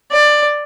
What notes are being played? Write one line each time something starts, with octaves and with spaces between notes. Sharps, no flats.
D5